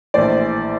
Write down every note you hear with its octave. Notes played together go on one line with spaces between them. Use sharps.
A#1 A2 E3 C5 D5